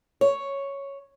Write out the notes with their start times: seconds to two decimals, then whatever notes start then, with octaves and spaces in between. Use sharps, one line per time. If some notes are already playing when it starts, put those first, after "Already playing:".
0.21 C#5